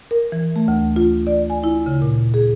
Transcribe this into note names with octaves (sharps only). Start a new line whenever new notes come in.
A#4
E3
A3
D2
F4
D5
G#5
E4
C#3
A#2
G#4